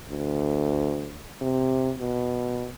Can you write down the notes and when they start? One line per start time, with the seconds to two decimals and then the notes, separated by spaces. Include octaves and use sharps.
0.10 D2
1.42 C3
2.00 B2